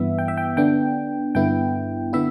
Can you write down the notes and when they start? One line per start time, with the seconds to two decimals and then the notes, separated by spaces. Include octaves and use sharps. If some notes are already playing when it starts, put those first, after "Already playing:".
Already playing: G2 E3 B3 E5
0.19 G5
0.28 E5
0.37 G5
0.57 D3 B3 D4 G5
1.35 G2 D3 B3 E4 G5
2.13 D3 B3 E4 E5